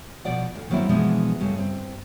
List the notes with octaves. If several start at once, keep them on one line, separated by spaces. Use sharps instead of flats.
B2 F3 D5 F#5
D2
D#3 F#3 A#3 C4 E4
B2 E3 F3 G#3 B3 D4
G2 C#3 G3 A3
G2 C4